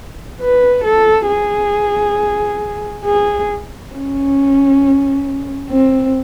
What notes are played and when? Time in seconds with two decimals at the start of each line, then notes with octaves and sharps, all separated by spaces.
0.40 B4
0.84 A4
1.28 G#4
3.04 G#4
3.94 C#4
5.70 C4